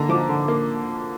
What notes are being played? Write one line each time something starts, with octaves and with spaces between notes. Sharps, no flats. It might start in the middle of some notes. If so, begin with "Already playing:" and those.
Already playing: D3 A#3 A#5
F3 D6
D3
A#3